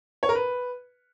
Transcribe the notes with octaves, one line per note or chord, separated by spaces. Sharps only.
C#5
A#4
B4